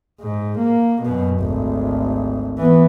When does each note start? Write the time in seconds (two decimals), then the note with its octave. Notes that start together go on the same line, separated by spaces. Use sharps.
0.21 G#2
0.59 A#3
1.03 F#2 B2
1.41 G#1 D2
2.58 E3 B3